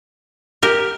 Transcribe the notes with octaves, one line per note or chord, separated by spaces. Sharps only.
G4 A#4